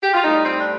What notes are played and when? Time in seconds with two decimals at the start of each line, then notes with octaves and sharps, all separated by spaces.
0.03 G4
0.14 F4
0.23 A2 G3 D#4
0.45 C4
0.59 D4